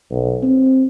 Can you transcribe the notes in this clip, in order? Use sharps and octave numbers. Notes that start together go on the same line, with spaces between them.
B1
C4